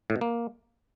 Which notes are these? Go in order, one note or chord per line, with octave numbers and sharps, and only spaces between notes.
A2
B2
A#3